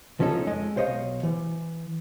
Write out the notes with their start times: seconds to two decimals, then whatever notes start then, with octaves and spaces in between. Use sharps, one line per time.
0.19 C#2 F3 C#4 D#4 A4
0.47 F2 G#3 D#5
0.76 B1 C5 C#5 D#5 F5
1.23 E3